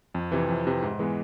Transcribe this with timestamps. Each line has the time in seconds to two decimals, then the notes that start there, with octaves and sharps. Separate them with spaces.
0.15 F2
0.32 C3 E3
0.49 F2
0.65 C3 E3
0.82 G#2
0.99 E3 G#3 B3